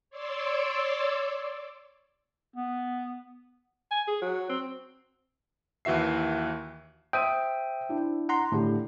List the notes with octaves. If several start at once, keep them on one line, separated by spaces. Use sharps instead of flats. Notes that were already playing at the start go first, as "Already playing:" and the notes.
C#5 D5 C6 D6 E6
B3
G#5
G#4
F#3
C4
D#2 E3 F#4 E5 C7
C5 E5 G5 D#6 D#7
D4 E4
F#5 A#5 C6
A2 D3 G4